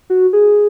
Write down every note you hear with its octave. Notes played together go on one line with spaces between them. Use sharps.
F#4
G#4